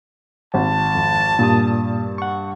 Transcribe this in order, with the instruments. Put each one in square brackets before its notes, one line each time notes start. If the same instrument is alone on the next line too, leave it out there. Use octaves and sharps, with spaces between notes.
[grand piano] G#1 [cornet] A5
[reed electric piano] F2
[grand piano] G2 [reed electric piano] A#2 D#6
[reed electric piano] F#5 C#6